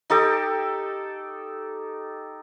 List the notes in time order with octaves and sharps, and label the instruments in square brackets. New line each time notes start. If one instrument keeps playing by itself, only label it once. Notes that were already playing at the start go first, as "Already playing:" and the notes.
[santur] D#4 G4 A4 D6